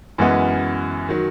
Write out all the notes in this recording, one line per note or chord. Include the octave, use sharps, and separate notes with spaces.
F#2 E3 G#3 B3 F#4
D#3 F#3